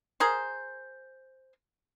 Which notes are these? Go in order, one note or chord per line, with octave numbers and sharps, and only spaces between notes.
G#4 A#4 C5